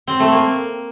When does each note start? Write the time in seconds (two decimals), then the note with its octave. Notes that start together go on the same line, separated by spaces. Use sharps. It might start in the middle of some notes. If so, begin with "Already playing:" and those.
0.07 C4
0.20 A3
0.32 A#3